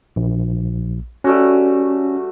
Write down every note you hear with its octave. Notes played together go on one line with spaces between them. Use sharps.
A#1
G3 A3 C#4 F#4